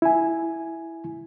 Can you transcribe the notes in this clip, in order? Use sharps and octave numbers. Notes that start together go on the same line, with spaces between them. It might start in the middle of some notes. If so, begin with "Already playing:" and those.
E4 G#5